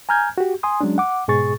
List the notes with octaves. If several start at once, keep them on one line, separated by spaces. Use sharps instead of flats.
G#5 A#5 F6 G6 G#6
F#4 G4
G#5 C6 D#6
F#3 G#3 C#4 D4
F#5 D6
G#2 B2 G#4 C#6 A6